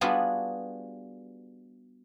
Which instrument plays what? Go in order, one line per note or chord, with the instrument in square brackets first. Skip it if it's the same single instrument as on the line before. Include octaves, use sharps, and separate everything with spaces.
[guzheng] G3 B3 D4 F4 F#4 G#4